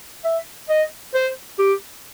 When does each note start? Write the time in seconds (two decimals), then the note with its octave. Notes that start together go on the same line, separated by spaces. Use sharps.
0.24 E5
0.69 D#5
1.14 C5
1.59 G4